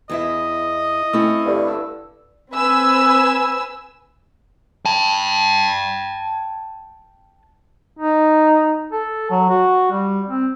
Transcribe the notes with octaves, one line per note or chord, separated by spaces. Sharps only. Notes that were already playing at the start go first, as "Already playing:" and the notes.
E2 E4 D#5 E5
A3 C4 C#4 E4 C#6 E6
G2 D3
E6
C4 B4 G#5 E6
G5 A5
D#4
A4
F#3
F#4
G3
C4